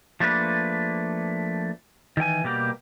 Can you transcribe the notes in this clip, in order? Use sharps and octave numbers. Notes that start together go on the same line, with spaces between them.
F3 A3 A#3 D4 B4
D#3 E3 G5 G#5
B2 G3 A#3 G4